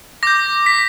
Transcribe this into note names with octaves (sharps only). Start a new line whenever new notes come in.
D6 G6 A#6
B6